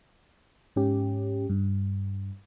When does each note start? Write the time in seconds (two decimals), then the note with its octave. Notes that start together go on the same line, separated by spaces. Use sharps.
0.76 G#2 C#4 G4
1.49 G2